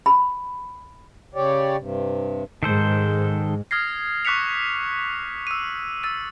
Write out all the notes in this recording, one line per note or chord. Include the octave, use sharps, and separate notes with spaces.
B5
C#3 G4 C#5 D5
G2 C3
G#2 D#3 G#3 A4 C5
D#6 F6 G#6 A#6 C7
C#6 D6 F#6 B6 C#7 F7
E6 D#7
E6 A6 D#7